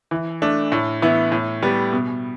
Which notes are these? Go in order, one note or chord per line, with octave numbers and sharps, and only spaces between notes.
E3
A3 D4
A2
E3 B3 E4
A2
G3 B3
B2